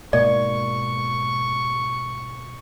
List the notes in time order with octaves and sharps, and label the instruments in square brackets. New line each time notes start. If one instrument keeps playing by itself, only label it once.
[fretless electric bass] G#2 B2 A#3 [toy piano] D5 [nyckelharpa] C#6